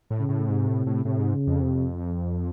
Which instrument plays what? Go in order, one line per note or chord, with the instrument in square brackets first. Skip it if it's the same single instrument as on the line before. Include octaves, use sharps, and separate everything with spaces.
[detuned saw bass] A2
[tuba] C#3
[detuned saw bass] A2
[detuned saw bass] G#2 [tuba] C3
[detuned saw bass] A2
A2
[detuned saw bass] A2 [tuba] C3
[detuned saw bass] G#2
[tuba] C#3
[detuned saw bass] F2
[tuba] C3